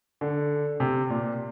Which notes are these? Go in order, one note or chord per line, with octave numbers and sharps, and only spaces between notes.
D3
C3
A#2